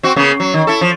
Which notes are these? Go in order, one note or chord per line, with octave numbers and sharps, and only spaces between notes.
C4 F#4
C#3 A#3 B3
F#3
D#3
E4 A4
F3